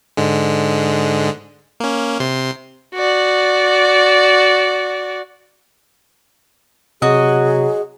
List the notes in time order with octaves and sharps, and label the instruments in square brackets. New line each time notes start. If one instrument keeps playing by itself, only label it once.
[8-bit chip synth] G#2 D3 G#3
A#3 C#4
C3 C6
[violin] F#4 D5
[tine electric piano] C3 [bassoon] F#3 [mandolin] F#4 D#5 [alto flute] G#4